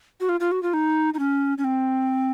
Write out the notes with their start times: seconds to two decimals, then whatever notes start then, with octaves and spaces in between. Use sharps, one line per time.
0.20 F#4
0.29 F4
0.40 F4
0.52 F#4
0.63 F4
0.74 D#4
1.14 D#4
1.19 C#4
1.58 C#4
1.64 C4